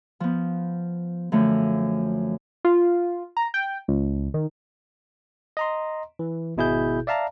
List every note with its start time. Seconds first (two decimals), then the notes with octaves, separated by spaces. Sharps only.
0.20 F3 B3
1.32 F#2 D3 F3 A3
2.65 F4
3.37 A#5
3.54 G5
3.88 C#2
4.34 D#3
5.57 D#5 A#5 C6
6.19 E3
6.57 G#1 B2 E4 G#4 G6
7.07 D5 E5 F5 A5 A#5